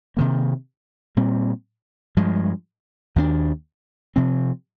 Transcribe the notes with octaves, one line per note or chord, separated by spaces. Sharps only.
C3 D#3 A#3
A#2 G3 C4
G2 F3 G#3
D#2 D#3 A#3 D4
C3 F3 C4